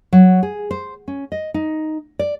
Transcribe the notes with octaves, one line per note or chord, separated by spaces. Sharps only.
F#3
G#4
C5
C#4
D#5
D#4
D5